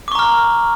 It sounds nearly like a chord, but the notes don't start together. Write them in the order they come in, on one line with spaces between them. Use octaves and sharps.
D6 C#6 A#5 F6